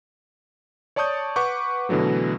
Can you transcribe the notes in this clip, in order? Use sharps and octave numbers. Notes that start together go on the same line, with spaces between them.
C#5 D5 A5 C#6 D#6 G6
B4 F#5 C#6 D6 G6
B2 D3 E3 F#3 A3